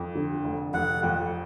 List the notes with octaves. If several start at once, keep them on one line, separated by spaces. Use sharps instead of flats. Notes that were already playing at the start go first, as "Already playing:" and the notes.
Already playing: F2
D3
F1
F1 F#5
F2